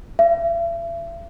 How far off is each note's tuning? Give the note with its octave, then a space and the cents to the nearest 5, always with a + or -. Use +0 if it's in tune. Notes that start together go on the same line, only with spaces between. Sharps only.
E5 +40